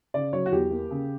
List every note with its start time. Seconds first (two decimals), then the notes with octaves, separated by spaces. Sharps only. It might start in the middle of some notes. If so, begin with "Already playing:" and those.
0.14 C#3 D5
0.33 F#3 C#5
0.46 F#4
0.52 E2 G4
0.71 A#3
0.91 C#3